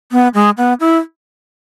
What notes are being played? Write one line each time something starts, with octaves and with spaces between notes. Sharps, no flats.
B3
G#3
B3
E4